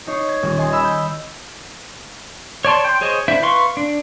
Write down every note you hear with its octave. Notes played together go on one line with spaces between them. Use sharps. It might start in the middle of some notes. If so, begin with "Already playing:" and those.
D#4 C#5 C7
G#6
D#1
D#5 G#5 C6
D#5 B5 E6
G6
C#5 D5 A5 C6
G5 C6
G#4 C5 C#5 D#5
D4 E4 C5 E5
B4 F5 C6 C#6
D4